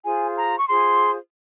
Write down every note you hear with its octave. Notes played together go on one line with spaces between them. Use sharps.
F4 G#4 C5 G#5
A#5
C#6
F4 G#4 C5 C6